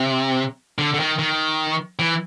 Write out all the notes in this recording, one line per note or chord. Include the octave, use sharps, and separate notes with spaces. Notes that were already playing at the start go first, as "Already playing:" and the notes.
Already playing: C3
D3
D3
D#3
D#3
E3